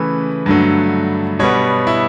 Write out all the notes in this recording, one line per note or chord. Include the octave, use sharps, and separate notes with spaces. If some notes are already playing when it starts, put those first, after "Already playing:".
Already playing: C#3 E3 A3 B4
G2 D3 F#3 A3
B2 G3 B3 C#5
E4